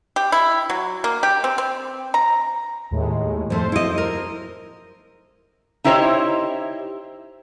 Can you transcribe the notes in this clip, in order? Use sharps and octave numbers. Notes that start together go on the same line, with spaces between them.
G4
E4
F#3
A#3
G4
C4
C4
A#5
D#2 A2 G#3
F2 A3 C5
E4 D#5
A#4
D#4 E4 G4 C5 C#5 D#5